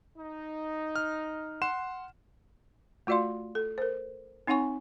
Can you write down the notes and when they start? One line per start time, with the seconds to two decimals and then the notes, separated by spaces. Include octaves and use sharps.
0.16 D#4
0.95 F6
1.62 F#5 C6 E7
3.07 A3 F4 F#4 D5 F5 C6
3.55 A4
3.78 A#4 C5
4.47 C4 D#4 C#5 F#5 G#5 C#6